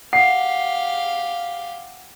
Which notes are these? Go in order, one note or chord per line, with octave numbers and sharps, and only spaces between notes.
G4 F5 F#5 C7